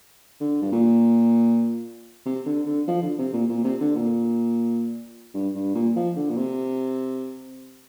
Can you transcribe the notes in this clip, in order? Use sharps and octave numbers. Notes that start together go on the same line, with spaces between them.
D3
G2
A#2
C3
D3
D3
F3
D3
C3
A#2
A#2
C3
D3
A#2
G2
G2
A#2
F3
D3
A#2
C3